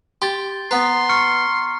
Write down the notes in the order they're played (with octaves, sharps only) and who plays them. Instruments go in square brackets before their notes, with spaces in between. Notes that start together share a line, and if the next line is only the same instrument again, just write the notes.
[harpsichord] G4 [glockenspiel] C6 A6
[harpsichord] B3 B4 [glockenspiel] A#5 [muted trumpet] C6
[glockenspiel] C#6 F6 C#7